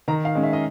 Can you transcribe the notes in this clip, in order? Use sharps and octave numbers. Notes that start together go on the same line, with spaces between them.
D#3 A#5
F5
G#3 C#4
E5
D#5